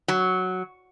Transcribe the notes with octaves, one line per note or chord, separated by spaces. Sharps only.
F#3